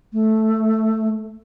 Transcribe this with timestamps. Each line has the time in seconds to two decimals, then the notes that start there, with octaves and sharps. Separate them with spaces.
0.13 A3